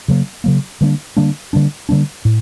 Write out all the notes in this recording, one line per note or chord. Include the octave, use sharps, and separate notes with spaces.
C#3 F#3 A#3
C#3 F#3 A#3
D3 G3 A#3 D4
D3 G3 A#3 D4
D3 G3 A#3 D4
D3 G3 A#3 D4
A2